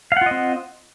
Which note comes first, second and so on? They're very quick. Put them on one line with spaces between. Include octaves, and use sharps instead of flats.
F5 F#5 F4 D#5 C4